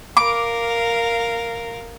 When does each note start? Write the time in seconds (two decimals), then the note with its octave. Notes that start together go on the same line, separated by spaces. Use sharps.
0.17 A#4 F5 D6